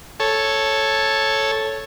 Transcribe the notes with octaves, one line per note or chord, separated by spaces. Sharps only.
A4 C#5